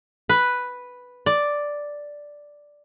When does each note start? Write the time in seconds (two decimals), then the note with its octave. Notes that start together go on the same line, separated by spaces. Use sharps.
0.29 B4
1.26 D5